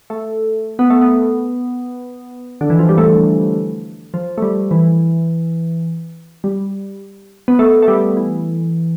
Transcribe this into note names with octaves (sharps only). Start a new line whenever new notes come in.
A3
B3
A3
B3
D3
E3
F3
G3
A3
F3
A3
G3
E3
G3
B3
A3
A3
G3
E3